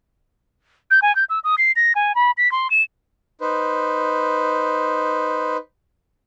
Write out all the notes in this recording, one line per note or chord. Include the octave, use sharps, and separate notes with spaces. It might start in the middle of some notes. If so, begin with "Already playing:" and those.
G6
G#5
G6
E6
D#6
C7
A#6
G#5
B5
B6
C6
E7
D#4 B4 C5